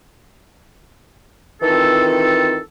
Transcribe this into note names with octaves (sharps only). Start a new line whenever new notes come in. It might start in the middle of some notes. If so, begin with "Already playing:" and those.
D#3 E3 C4 F4 A4